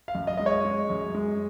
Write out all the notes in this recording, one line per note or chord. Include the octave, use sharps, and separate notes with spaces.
F5
F#2
D#5
G#3 D#5
C#5
G#3
F#2
G#3